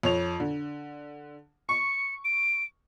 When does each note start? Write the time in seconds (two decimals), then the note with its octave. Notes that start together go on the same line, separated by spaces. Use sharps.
0.03 F2 C#5 F7
0.40 D3
1.69 C#6 C#7
2.25 D7